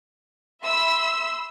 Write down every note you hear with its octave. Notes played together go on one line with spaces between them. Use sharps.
E5 B5 C6 E6